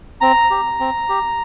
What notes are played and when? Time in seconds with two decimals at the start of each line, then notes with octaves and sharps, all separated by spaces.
0.21 C4 A#5
0.51 G4
0.80 C4
1.09 G4